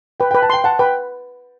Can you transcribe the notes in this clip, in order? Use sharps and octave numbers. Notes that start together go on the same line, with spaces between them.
B4 G5
B4 G5
A5
G5 C6
F#5 A5
B4 G5